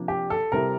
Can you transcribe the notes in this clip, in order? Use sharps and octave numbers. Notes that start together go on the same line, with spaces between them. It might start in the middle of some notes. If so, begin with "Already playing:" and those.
Already playing: C3 F3 A#3 D4
G4
A4
C3 G3 C4 E4 A#4